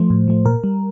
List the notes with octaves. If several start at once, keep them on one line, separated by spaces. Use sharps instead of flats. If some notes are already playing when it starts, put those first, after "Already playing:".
Already playing: F3 A3 C5
A2
F3 A3
A#2 A#4
G3